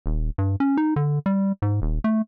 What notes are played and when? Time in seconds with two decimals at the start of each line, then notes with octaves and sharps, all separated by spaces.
0.06 D#1
0.38 G2
0.60 C#4
0.77 D#4
0.96 D3
1.26 G3
1.62 G#2
1.82 D#1
2.04 A3